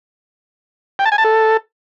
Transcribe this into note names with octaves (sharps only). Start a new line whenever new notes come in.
G5
A5
G#5
A5
A4